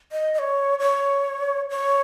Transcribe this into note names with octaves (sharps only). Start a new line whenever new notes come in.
D#5
D#5
C#5
C#5
C#5